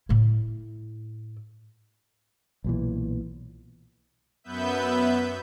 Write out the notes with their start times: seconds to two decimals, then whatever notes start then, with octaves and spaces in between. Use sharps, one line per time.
0.09 A2 E4
2.64 B1 A#2 E3
4.44 F#2 B3 B4 E5 G6